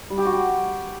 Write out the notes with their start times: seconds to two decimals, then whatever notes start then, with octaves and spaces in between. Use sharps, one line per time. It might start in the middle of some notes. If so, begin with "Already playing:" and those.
0.10 G3
0.18 G4
0.25 F#4
0.32 G4